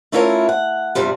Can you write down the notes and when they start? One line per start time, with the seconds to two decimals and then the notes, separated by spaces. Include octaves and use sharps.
0.12 A3 C#4 E4 F4 A#4 C#5
0.49 F#5
0.95 E2 G2 C3 G3 F4